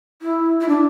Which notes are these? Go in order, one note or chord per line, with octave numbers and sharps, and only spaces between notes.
E4
E4
D4